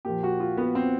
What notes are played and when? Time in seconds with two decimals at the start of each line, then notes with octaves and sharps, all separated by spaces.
0.05 A#2 F3 G4
0.23 F#4
0.40 F4
0.57 B3
0.75 C4